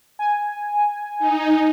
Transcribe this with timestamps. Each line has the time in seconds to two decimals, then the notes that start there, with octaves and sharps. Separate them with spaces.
0.19 G#5
1.19 D#4